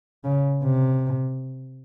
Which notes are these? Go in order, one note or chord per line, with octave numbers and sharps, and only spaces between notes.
C#3
C3